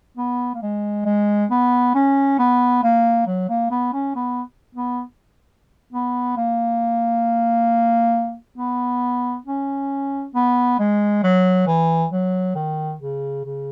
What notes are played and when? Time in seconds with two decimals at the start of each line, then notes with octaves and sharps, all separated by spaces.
0.17 B3
0.55 A#3
0.62 G#3
1.06 G#3
1.51 B3
1.95 C#4
2.39 B3
2.83 A#3
3.27 F#3
3.49 A#3
3.71 B3
3.94 C#4
4.16 B3
4.75 B3
5.93 B3
6.37 A#3
8.58 B3
9.46 C#4
10.35 B3
10.79 G#3
11.23 F#3
11.67 E3
12.12 F#3
12.55 D#3
13.00 C#3
13.44 C#3